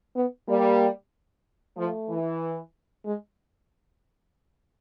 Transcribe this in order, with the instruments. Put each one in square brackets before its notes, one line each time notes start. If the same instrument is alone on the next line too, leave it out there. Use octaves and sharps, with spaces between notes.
[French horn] B3
[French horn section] G3 [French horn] A#3
[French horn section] F3 [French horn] A3
[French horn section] E3
[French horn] G#3